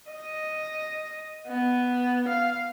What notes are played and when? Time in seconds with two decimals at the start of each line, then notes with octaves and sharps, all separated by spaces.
0.11 D#5
1.48 B3
2.28 F5